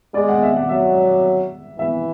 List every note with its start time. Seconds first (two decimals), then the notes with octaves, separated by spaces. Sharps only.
0.14 G#3 D5
0.29 F#5
0.43 E5
0.56 F#5
0.69 F#3 E5
1.78 E3 E5